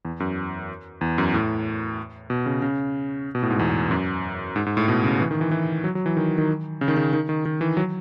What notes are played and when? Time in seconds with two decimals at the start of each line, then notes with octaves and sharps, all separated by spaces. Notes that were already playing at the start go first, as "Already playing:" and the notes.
0.05 E2
0.20 F#2
1.01 E2
1.18 F#2
1.34 A2
2.30 B2
2.46 C#3
2.62 C#3
3.35 B2
3.43 A2
3.50 G#2
3.59 E2
3.91 F#2
4.56 G#2
4.66 G#2
4.77 A2
4.88 B2
5.04 C#3
5.20 E3
5.31 D#3
5.41 E3
5.51 E3
5.84 F#3
5.95 F#3
6.06 E3
6.17 D#3
6.38 D#3
6.81 C#3
6.88 D#3
6.97 C#3
7.13 D#3
7.29 D#3
7.45 D#3
7.61 E3
7.77 F#3